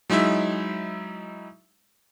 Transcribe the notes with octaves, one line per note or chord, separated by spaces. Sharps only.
F#3 G#3 D#4 E4 E5